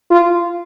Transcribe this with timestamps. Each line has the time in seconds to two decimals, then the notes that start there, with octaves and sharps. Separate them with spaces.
0.11 F4